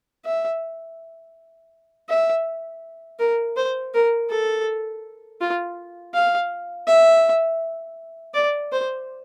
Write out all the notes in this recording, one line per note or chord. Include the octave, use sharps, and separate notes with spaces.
E5
E5
A#4
C5
A#4
A4
F4
F5
E5
D5
C5